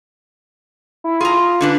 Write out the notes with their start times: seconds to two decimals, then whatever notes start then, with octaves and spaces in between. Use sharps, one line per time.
1.04 E4
1.21 F4 G#4 A#5
1.61 D3 D4 B4